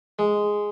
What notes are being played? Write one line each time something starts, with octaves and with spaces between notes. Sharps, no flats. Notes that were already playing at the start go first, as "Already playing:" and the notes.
G#3